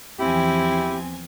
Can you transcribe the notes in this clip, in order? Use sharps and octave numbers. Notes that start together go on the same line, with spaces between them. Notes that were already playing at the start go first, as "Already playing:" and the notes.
E2 F3 C4 E4 G4 G#5